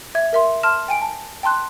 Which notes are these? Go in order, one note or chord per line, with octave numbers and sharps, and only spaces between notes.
E5 G#6
A#4 E5 C6
A5 C6 F6 E7
G5 G#5 D7
A5
G5 A5 C6 F#6